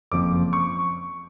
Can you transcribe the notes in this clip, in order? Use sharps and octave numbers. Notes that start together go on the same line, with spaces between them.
F#1 F2 F3 D6
C#6